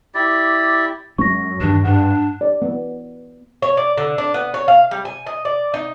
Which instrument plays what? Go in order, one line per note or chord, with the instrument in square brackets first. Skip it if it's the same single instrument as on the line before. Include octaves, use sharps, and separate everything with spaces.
[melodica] E4 G4 D5
[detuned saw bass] F#2 [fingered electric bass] F#3 G#3 C#4 [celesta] C#6 A#6
[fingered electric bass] E2 D#3 [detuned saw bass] G2 [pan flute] D4
[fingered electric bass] G#2 [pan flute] D4 [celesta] F#5
[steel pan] D5
B3
[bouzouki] C#5
D5
D3
D4
B3
C#5
F5
G3
G#5
D#5
D5
D#4